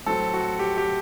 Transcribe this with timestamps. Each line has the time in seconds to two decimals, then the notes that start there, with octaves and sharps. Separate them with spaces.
0.06 A2 F#3 A3 C4 A4
0.33 F#4
0.59 G4
0.78 G4